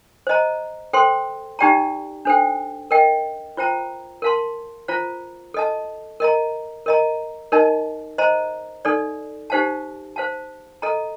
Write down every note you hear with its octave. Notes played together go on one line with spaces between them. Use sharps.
C5 D#5 A#5
A4 C5 G5 C6
D#4 G4 D5 G5 A#5
D4 A4 C5 G5
A#4 D#5 G5
F4 C5 G5 A#5
A#4 F5 A5 C6
F4 C5 F5 A#5
A4 D#5 A5
A#4 D#5 A#5
A#4 D#5 A#5
D#4 A#4 D#5 A5
C5 D#5 A#5
D#4 A4 D5
D#4 G4 C5 F5 A5
C5 F5 A5
A4 D#5 A#5